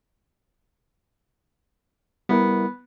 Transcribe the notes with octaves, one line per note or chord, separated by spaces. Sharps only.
G3 B3 E4 A#4